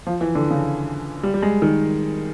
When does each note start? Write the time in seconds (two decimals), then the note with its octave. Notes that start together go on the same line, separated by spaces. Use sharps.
0.07 F3
0.21 E3
0.35 D3
0.50 C#3
1.23 G3
1.34 G3
1.42 G#3
1.62 D#3